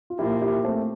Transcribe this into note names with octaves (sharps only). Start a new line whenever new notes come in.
F4
A#2 F3 A#3 E4 G4
E4 G4
A3 C4